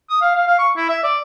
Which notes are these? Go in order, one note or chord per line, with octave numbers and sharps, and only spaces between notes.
D#6
F5
F5
F5
C#6
E4
E5
D5